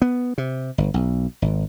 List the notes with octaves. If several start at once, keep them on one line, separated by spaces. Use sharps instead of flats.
B3
C3
G1
B1
G#1